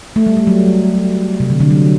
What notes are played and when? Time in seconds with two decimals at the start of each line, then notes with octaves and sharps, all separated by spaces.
0.16 A3
0.27 G3
0.37 G3
0.47 F#3
1.40 C3
1.50 D3
1.60 D3
1.71 F#3